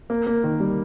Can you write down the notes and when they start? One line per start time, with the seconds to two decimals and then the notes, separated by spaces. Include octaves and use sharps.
0.10 A#3
0.27 A#3
0.44 D#3
0.60 G3